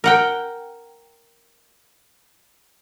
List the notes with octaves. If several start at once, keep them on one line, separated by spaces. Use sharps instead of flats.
A#4 F#5 G5